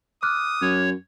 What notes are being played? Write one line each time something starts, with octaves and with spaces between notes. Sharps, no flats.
D6 D#6 F6 F#6
F#2 C#5